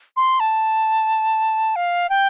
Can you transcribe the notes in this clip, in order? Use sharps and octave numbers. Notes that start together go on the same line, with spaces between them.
C6
A5
F5
G5